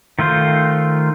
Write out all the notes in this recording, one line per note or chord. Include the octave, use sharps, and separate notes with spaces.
D#3 A3 F4 C5